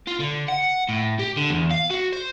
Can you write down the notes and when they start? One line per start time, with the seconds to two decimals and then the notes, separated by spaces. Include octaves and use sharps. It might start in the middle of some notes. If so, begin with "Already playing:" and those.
0.07 F4
0.20 D3
0.49 F#5
0.89 A2
1.19 G4
1.37 D3
1.50 E2
1.71 F5
1.90 F#4
2.13 C5